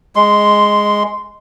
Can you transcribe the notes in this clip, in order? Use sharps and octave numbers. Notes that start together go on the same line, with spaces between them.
G#3 C6